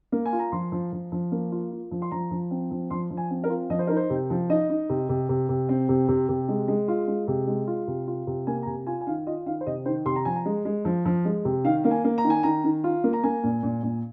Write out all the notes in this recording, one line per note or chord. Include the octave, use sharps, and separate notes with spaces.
A#3
G#5
F4
A#5
F3 C6
F3
F3
F3
A#3
F4
F4
F3
C6
F3 A#5
F3
C4
F3
F3 C6
F3
G#5
C4
A#4
F4
F3 D#5
C5
D#4 A#4
C5
C3
F3
D#4 D#5
D#4
C3
C3
C3
C3
C4
C3
C3
C3
G#3
G#3
F4 F5
G#3
C3
G#3
F4
C3
F4
C3
A#3 G#5
A#5
C3 G#5
F4 G#5
G#5
D#3 F5
F4 D#5
D#3 F5
C5
C3 D#5
D#3 C5
C3 C6
A#5
F3 G#5
A#5
G#3
G#3
F3
F3
G#3
C3
D#3 F5
A#3 F5
G#5
A#3
A#5
D#3
G#5
D#3 A#5
D#3
F4
A#3
A#5
A#3 G#5
A#2
A#2
A#2